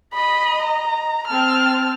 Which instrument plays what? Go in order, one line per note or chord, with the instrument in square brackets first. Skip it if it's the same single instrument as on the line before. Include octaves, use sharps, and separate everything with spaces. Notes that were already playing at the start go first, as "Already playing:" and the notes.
[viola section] D#5 [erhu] B5
[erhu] A#5
[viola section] C4 A5 [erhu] F6